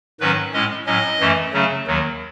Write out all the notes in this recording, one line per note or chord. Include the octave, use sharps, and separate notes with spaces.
G#2 D#3 F#3 C#4 B4
A2 G#3 C#4 D#5
A2 F#3 C#4 D#5
F#2 E3 A3 C#4
C#3 F#3 A3 C#4
D#2 D#3 F#3